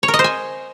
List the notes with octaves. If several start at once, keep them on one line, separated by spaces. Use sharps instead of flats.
C#5
A#4
D#5
C5
G#5